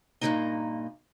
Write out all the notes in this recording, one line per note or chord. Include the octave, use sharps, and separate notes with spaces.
G2 A#2 F3 F#3 A#3 D#4